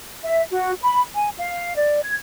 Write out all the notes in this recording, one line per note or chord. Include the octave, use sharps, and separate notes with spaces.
E5
F#4
B5
G#5
F5
D5
G#6